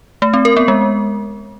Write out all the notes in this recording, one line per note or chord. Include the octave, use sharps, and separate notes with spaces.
A3
C4
A#4
B3
G#3